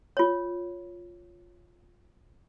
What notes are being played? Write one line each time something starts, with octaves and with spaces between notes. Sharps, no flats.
F4 C#5